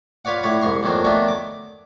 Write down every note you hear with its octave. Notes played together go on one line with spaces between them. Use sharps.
F4 B4 C#5 D5 F#5
A2 D3 C#5 B5
C2 G#2 C6 C#6
F2 A#2 D#3 F#3 D4
D3 D#3 F#3 A3 B3 D4
D6